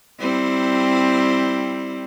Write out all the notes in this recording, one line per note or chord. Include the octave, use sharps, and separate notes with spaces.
G3 C4 E4